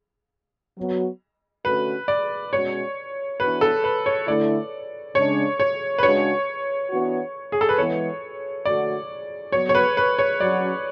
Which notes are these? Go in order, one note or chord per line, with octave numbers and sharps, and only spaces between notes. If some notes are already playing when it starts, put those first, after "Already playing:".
F#3 B3 F#4
D3 A3 C#4 F#4 B4
D5
B2 G#3 C#4 F#4 C#5
E3 B3 D4 F#4 B4
A4
B4
C#5
D3 A3 E4 D5
C#3 G#3 D4 C#5
C#5
B4
C#3 G#3 D4 F#4 C#5
E3 B3 D4 F#4
G#4
A4
B4
E3 G#3 B3 C#5
D3 A3 D4 F#4 D5
F#3 B3 F#4 C#5
C#5
B4
B4
C#5
F#3 C#4 F#4 D5